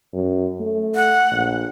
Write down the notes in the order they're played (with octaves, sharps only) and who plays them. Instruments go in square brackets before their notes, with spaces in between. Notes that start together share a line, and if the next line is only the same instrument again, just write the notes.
[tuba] F#2
A3
[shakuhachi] F#5
[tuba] A#1